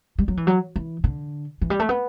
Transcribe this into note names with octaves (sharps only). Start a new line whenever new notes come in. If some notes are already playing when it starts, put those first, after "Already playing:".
G3
F#3
E3
F#3
E3
D3
E3
G3
A3
B3